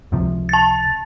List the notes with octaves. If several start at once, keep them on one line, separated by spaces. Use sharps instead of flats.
C#2 C3 F3
A5 A6